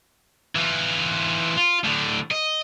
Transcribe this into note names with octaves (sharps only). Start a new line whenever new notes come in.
E3 F4
F4
A2 D3
D#5